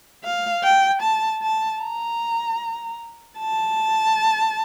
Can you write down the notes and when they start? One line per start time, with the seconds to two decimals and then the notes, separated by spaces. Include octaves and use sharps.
0.23 F5
0.64 G5
1.02 A5
1.42 A5
1.82 A#5
3.39 A5